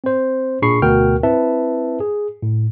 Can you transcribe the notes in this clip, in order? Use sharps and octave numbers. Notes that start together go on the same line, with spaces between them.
C4 C5
A#2 D4 G#4 B5 C#6 C7
D2 B2 F#4 A#4 G5 F6
C4 E4 B4 E5 A5
G#4
A2